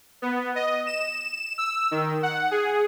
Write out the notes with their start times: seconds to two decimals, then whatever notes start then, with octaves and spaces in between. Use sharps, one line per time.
0.22 B3
0.55 D#5
0.87 E7
1.58 E6
1.91 D#3
2.23 F#5
2.51 G#4